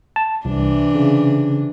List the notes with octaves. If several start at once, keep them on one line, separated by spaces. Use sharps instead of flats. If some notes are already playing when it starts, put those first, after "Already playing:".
A5
C2 C3 E3 D4
C#3